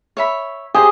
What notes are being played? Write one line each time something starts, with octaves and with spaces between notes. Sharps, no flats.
C#5 E5 B5
G4 G#4 C5 D#5